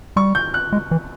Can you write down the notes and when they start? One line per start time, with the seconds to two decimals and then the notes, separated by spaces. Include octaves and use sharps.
0.16 G3 C#6
0.35 G6
0.54 F#6
0.73 G#3
0.91 E3